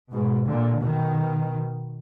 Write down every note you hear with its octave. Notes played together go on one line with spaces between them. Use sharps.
G#2 B2
A#2 D3
B2 D#3